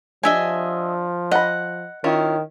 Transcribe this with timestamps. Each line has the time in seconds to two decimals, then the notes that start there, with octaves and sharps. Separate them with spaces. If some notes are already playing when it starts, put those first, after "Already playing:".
0.23 F3 D4 G4 D#5 E5 G#5
1.31 D#5 F#5 B5
2.04 D#3 C#4 E4 F4